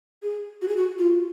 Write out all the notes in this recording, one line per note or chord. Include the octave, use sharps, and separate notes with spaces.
G#4
F#4
G#4
F#4
F4